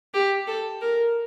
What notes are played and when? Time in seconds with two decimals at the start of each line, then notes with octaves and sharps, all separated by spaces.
0.14 G4
0.47 A4
0.81 A#4